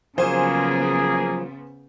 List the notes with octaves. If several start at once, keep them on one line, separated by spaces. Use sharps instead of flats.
C#3 F3 F#3 A#3 B3 G#4 C5 G#5